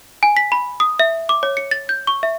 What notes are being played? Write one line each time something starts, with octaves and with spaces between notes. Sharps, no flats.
G#5
B6
B5
D#6
E5
D6
C#5
C#7
A6
G6
C#6
E5